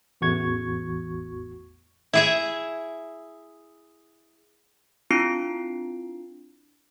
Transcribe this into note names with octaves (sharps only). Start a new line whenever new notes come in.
A1 E2 F#4 C#6 G#6
E4 G#4 E5
C4 D4 E4 F4 C7 D7